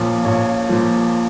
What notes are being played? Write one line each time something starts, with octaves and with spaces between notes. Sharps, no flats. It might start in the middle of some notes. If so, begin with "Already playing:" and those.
Already playing: A#1 A#2 F3 C#5 F5
A#1 C#5
A#2 F3